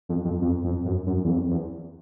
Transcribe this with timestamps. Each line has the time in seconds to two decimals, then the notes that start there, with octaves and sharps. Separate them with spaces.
0.09 F2
0.25 F2
0.42 F2
0.64 F2
0.85 F#2
1.06 F#2
1.24 E2
1.29 F2
1.50 E2